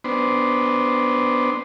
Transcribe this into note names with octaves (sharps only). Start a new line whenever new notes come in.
B3 D4 C5